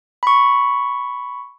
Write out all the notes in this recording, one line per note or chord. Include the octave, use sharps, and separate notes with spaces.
B5 C#6